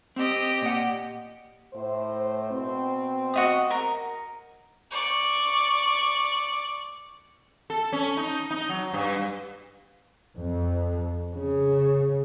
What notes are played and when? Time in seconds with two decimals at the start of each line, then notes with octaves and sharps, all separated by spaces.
0.16 C4 G4 D#5
0.62 A#2 F#5
1.74 A2 C5
2.51 B2 B3 C4
3.34 F#4 D#5 D#6
3.71 A#4
4.91 D5 C#6
7.70 A4
7.93 C#4
8.17 D#4
8.51 D#4
8.69 F#3
8.93 G2
10.37 F2
11.33 C#3